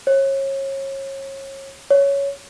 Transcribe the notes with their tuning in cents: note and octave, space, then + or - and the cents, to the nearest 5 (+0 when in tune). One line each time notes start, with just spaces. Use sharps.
C#5 -30
C#5 +10